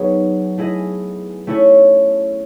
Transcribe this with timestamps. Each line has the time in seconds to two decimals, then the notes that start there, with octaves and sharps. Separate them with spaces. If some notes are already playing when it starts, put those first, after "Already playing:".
Already playing: F#3 B3 D#4 G#4
0.58 A3 E4 G#4 D#5
1.47 A3 C#4 E4 A4 C#5